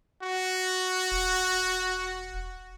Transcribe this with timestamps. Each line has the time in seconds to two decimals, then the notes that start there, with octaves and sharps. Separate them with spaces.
0.23 F#4
1.12 E1